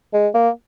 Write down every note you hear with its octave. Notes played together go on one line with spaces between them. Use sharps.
G#3
A#3